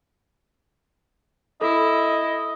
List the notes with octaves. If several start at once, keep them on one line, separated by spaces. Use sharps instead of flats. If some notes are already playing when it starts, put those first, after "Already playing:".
E4 A4 D#5